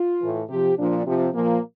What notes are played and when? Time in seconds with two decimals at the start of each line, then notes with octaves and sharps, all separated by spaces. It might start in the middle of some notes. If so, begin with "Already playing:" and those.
Already playing: F4
0.20 A2 E3
0.49 C3 F3 G4
0.77 A#2 F3 D4
1.05 C3 F3
1.34 A#2 F3 A#3